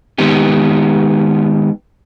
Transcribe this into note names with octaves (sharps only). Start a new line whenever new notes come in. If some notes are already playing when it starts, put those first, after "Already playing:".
D#3 G#3 B3 D#4 G4